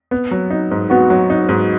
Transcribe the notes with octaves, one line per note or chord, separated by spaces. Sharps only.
B3
F#3
D#4
G#2
B3 F#4
F#3
D#4
G#2